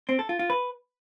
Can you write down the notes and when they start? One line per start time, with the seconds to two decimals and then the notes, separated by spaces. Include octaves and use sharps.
0.09 C4
0.19 A4
0.29 F4
0.39 F4
0.50 B4